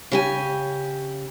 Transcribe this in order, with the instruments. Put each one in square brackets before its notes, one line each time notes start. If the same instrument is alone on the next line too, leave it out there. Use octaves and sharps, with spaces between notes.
[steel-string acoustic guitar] C#3 G4 G#5